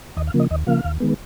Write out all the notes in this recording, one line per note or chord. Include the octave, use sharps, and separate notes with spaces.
D#2 D#5
F5
C#3 F3 A#3
D#5
D#2 D#5
C#3 F3 A#3 F5
D#2
D#3 G#3 B3